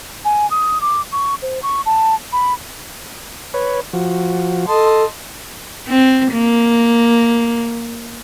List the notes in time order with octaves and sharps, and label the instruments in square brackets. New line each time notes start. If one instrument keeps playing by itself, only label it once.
[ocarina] G#5
D#6
D6
C#6
C5
C#6
A5
B5
[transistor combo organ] B4 C#5
F3 F#4
[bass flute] A4 [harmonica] D#5 A5 C6
[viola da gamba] C4
A#3